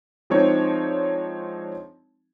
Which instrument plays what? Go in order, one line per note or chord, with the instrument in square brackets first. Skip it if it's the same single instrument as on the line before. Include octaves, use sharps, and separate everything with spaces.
[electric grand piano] F3 G#3 C4 D4 D#4 C#5